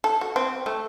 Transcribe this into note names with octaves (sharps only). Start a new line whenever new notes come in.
A4
F#4
C4
A3